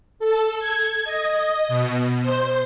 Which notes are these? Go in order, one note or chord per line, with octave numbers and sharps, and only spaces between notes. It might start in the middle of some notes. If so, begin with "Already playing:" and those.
A4
G#6
D#5
B2
C5